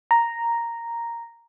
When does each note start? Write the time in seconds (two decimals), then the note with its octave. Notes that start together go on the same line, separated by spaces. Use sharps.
0.11 A#5